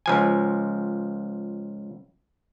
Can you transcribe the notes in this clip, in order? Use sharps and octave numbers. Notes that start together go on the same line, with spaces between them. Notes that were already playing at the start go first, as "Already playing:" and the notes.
C#2 F3 G#5